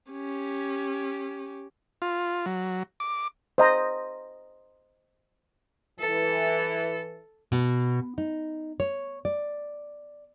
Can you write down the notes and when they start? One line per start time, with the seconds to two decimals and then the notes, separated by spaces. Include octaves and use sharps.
0.11 C#4 G4
2.02 F4
2.46 F#3
3.00 D6
3.58 C5 D#5 A#5
5.99 E3 A4
7.52 B2
8.18 D#4
8.80 C#5
9.25 D5